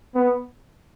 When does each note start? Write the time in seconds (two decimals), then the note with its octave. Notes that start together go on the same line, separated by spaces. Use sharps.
0.15 B3